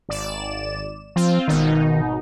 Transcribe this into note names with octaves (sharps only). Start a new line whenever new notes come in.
G#1 D5 E7
F3 C4 F4
G#1 B2 D#3 D#4